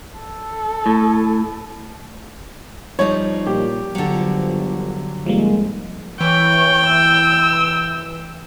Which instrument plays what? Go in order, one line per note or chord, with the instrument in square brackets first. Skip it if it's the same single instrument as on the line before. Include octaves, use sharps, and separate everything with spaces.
[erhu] A4
[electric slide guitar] A2
[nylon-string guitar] F3 G3 D#4 [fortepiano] C#5
[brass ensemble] A#2 [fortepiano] G4
[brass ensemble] G1 F3 [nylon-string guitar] D3 F#3
[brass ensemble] F2 G#2 G#3 [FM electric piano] F3 G3 A#3
[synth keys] E3 [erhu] C#5 [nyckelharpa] G5
[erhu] E6